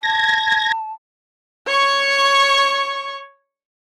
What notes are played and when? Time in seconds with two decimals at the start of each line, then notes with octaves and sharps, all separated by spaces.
0.03 A5 G#6 A#6
1.67 C#5 C#6